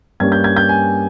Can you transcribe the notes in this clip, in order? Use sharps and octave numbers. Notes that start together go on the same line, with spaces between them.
G2 G3 A#3 C#4 G#6
G6
G#6
G6
G#5